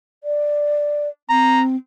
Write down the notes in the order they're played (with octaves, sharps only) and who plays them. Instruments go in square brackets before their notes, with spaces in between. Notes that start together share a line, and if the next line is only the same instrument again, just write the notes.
[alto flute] D5
[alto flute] C4 [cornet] A#5